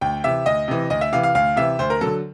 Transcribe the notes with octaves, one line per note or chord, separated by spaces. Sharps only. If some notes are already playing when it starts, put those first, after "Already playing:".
D2 G5
C3 E3 E5
D2 D#5
C3 E3
D2 D#5
E5
C3 E3 F5
F5
D2 F5
C3 E3 E5
D2 C5
A#4
D3 F#3 A4